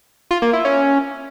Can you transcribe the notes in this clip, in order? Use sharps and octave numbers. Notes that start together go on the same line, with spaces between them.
F4
A#3
E4
C#4